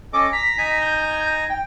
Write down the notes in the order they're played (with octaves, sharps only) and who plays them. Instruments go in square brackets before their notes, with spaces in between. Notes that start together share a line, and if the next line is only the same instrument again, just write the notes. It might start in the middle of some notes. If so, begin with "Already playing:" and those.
[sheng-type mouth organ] C#4 A4 D#5 [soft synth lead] D6
[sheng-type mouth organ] A#5 [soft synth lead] B6
[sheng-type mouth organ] D#4 G#5 A#5
[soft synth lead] G6
G5